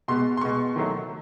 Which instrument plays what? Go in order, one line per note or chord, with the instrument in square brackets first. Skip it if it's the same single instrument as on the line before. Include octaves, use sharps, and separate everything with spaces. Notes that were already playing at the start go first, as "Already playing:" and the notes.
[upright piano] B2 G#3 B3 C6
C6
B2 G#3 B3 C#6
D#3 F#3 A3